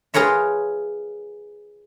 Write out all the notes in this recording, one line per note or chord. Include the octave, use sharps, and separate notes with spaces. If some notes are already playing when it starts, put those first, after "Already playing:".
F4 G#4 A#4 B4 C#5 E5